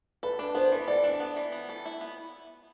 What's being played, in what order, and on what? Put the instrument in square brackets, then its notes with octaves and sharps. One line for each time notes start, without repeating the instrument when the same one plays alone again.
[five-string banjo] A4 [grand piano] B4
[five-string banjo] D4
[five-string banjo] B3 [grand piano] C5
[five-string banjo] E3
[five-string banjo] A4 [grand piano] D5
[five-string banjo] D4
B3
E3
B3
A4
E4
B3